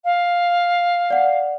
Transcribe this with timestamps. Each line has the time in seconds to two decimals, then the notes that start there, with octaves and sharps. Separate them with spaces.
0.04 F5
1.10 D5 F#5